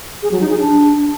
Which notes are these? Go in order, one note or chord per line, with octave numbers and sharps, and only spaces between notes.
G#4
F#3
D#4
G#4
D4